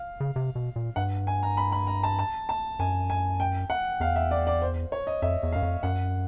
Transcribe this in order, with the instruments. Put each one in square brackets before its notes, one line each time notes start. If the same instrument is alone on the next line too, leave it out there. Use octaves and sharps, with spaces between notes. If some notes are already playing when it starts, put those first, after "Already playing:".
Already playing: [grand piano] F5
[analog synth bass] C#3
C3
B2
A#2
[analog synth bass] G2 [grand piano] F#5
[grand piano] G#5
A#5
B5
B5
A#5
A5
A5
A5
[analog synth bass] F#2 [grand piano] G#5
[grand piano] G#5
G5
F#5
[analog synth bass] E2 [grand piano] F5
[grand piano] E5
D5
D5
C5
C#5
D#5
[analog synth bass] F2 [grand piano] E5
[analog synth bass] E2
[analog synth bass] F#2 [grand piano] F5
[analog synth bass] F2
[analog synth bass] F#2 [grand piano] F#5